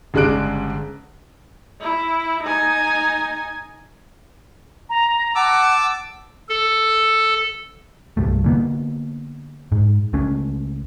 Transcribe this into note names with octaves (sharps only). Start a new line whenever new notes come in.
G1 C#3 G#3 D4 F#6 D7
E4
D#4 G#5
A#5
F#5 A5 D6 E6
A4
C2 G2 A3
D3 A#3 B3
G#2
C#2 A3 C#4